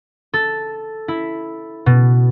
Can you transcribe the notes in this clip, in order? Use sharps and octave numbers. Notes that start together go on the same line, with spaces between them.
A4
E4
B2